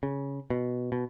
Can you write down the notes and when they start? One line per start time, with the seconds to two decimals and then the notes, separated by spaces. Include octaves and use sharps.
0.03 C#3
0.50 B2
0.92 B2